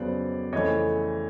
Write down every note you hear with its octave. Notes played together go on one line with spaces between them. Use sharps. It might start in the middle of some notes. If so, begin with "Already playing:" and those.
Already playing: F2 C#3 F#3 B3 C5 D5
F2 C#3 E3 A3 C#5 D#5